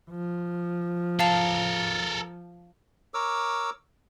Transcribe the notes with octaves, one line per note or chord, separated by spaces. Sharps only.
F3
A4 A#4 F5 A5 F7
A#4 C#5 D6 E6